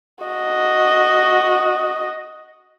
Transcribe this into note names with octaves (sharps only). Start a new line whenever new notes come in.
F#4 D#5